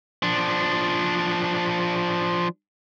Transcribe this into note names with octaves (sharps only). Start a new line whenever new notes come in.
F3 D4